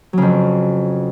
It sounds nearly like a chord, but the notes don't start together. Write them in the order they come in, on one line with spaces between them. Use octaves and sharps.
F#3 C#3 F2